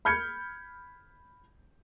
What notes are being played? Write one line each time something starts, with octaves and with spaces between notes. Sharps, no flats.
B5 F6 G6 G#6 C#7